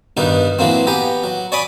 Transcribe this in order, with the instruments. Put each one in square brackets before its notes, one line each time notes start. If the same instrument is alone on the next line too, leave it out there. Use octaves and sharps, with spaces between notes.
[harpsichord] G2 B2 D#3 G3 D#4
E3 F#3 A#3 C4
B3 G4 G#5 A#5
F#3
C#5 D5 G#5 B5 D6 D#6